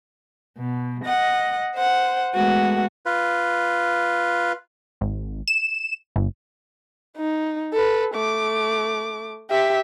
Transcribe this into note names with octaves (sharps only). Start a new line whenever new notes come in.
B2
D#5 F#5
C5 F#5
G#3 A3 B3 F#4
F4 B4
G#1
E7
G1
D#4
A4 B4
A3 D6
G4 E5